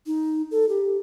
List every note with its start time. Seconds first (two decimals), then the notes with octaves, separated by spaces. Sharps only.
0.06 D#4
0.51 A4
0.69 G4